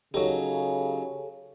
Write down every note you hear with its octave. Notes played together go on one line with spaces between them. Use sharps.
C#3 F#3 D#4 G4 A4 C#5